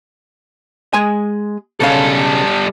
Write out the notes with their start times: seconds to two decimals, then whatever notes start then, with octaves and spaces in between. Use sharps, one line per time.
0.93 G#3 G#5
1.80 B1 C#3 G3 A4 F5